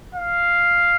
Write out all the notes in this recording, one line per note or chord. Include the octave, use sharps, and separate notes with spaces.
F5